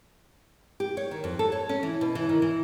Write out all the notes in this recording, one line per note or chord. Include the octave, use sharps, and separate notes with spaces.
G4
C#5
D#3
F2
A4
C#5
C#4
E3
B2
E3
D#3
E3